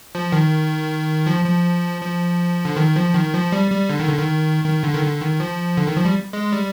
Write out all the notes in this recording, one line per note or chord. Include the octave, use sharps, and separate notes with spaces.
F3
D#3
F3
F3
F3
D3
D#3
F3
D#3
F3
G3
G3
D3
D#3
D3
D#3
D#3
D3
D#3
D3
D#3
F3
D3
D#3
F3
G3
G#3
G3